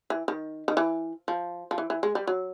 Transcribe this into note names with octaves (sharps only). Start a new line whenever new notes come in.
E3
D#3
D#3
E3
F3
F3
E3
E3
G#3
G3
F#3